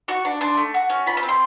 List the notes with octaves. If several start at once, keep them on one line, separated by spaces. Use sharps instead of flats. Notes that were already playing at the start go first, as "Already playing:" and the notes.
F#4 C#6
D4
D4 C6
A3
F#4
C#4
F4 B5
B5
C4
C6